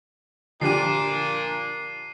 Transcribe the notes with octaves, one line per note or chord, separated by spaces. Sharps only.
A#2 D3 F3 D4 G4 C7 D#7